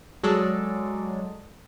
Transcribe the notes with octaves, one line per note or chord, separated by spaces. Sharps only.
F#3 G#3 A4 D5